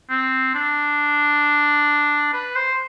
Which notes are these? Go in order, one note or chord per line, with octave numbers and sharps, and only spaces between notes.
C4
D4
B4
C5